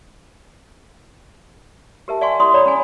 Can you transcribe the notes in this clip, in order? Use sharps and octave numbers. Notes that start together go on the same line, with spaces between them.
G4 A#4 E5 A5
D5 E5 F#5 G#5 C6 C#6
E4 G4 D5 C6 D#6
C#5 D5 A#5 B5
C#4 F#5 G#5